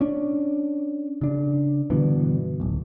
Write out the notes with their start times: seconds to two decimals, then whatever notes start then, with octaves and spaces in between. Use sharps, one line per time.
0.01 C#4 D4
1.21 C#3 D4
1.90 G2 B2 D3 E3
2.60 D1 B1